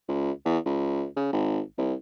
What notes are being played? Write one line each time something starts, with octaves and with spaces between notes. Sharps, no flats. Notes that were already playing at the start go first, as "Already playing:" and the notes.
C#2
E2
C#2
C#3
G#1
C2